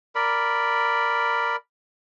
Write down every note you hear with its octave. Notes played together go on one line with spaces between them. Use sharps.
A#4 D5 B5